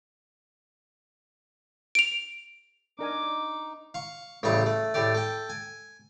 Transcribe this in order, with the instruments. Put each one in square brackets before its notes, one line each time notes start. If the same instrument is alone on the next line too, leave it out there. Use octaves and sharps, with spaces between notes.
[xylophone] D7 F7
[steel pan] D4 A#4 G#5 [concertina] D#4 [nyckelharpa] D6
[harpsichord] F5 C#6
A1 C#3 G3 A3 C#6
A3
A2 A3 G4 D5
A4 G5
G#5